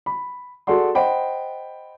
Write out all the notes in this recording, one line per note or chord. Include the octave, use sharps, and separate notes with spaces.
B5
F#4 G#4 A4 D5 F#5 C6
C5 D#5 F#5 G5 B5